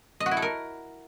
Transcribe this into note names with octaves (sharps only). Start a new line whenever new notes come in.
D#5
F#4
E4
A4
A#4